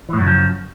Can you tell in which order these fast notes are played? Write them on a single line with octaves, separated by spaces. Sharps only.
E3 A2 F#2 C#3 F3